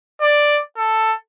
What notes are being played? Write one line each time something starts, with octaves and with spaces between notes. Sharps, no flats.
D5
A4